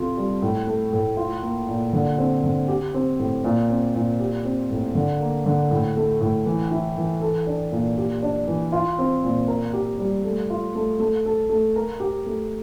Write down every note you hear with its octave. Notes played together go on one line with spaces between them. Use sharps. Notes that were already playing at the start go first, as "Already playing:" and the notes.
Already playing: C3 F4 A4
G3
A2
A3
A2
F4
A#3
A#2
D3
C4
D3
G4
C4
A2
A#2
C4
A#2
G4
C4
A2
D3
A#3
D3
A2
A3
A2
E3
E4
E3
A4
D4
A#2
G4
D4
E3
F4
C4
A#2
A#4
G4
G3
A3
F4
A3
A3
A4
A3
A#4
G4
A3